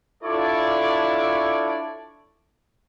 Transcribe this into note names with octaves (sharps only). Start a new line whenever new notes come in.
D4 E4 F4 A4 C#5 D5